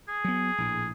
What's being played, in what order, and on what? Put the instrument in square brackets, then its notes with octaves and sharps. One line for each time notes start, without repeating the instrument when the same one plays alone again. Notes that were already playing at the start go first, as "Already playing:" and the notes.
[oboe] G#4
[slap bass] F#3 B3
A#1 A2